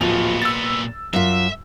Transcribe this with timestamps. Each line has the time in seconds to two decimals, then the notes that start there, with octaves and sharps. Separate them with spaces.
0.01 D1 A#2 F3 B3 F7
0.42 E6 A6
1.13 F#2 F4 E5